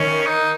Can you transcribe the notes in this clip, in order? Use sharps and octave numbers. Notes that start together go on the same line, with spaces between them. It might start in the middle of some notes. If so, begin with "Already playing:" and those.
Already playing: D#3 C#4
D#4